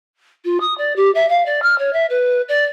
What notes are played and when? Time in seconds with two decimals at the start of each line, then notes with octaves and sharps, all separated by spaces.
0.44 F4
0.60 D#6
0.77 D5
0.96 G4
1.14 E5
1.29 F5
1.45 D5
1.62 F6
1.78 C#5
1.93 E5
2.09 B4
2.48 D5